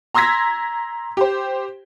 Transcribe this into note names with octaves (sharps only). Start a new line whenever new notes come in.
A#5 C6 E6 G#6 A#6 B6
G4 C5